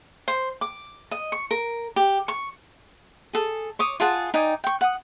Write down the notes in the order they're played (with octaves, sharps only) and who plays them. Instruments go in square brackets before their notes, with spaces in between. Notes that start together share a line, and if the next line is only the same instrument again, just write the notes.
[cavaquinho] C5
D6
D#5
C#6
A#4
G4
C#6
G#4 A4
C#5 D6 D#6
F4 G#4 F#5 A5
D#4 D5 G5 G#5
G5 C#6
F#5 D#6